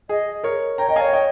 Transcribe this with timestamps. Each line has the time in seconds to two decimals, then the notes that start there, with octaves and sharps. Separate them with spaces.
0.09 G#4 D#5
0.44 A#4 C#5
0.78 C#5 G5 A#5
0.89 D#5 G5
0.96 F5 G#5
1.01 C#5
1.13 D#5 G5